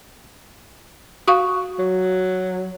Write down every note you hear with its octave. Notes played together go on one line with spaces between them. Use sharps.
F#4 F5 C#6 D#6
F#3